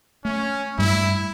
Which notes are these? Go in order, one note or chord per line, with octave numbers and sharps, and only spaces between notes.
A3 C#4
G2 G3 A3 E4